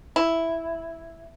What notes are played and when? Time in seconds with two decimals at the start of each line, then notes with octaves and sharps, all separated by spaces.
0.16 E4